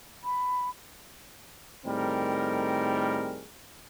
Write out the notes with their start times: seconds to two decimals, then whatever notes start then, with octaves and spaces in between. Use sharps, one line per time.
0.24 B5
1.86 A2 D#3 G3 C4 G#4 A#4